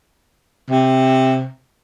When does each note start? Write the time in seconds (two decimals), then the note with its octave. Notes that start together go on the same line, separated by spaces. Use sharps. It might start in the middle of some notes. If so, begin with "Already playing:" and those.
0.70 C3